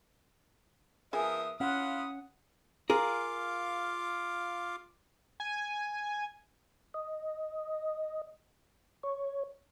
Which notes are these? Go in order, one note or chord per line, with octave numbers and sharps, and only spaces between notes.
F3 B3 G#4 A#4 E5 G#5 D#6
C#4 E4 F4 F5 F#5 D#6
F4 G#4 A#4 F5 D6
G#5
D#5
C#5